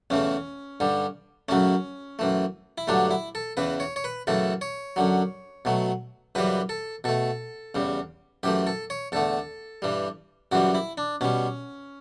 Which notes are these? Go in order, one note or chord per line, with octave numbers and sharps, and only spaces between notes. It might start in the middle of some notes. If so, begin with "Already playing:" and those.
E2 C#3 E3 A3 C#4
G2 D3 G3
F#2 C#3 F#3 A3 C#4
F#2 E3 A3
E4
G2 D3 F#3 A3 D4
E4
A4
E2 C#3 E3 B4
C#5
C#5
B4
F#2 C#3 E3 A3 A4
C#5
F#2 D3 F#3
B2 F#3 A3
F#2 C#3 E3 G3 B4
A4
B2 A3 A4
E2 C#3 G3
F#2 E3 A3 G4
A4
C#5
E2 D3 A3 A4
G2 E3 G3
F#2 C#3 E3 G3 F#4
E4
D4
B2 G3 C#4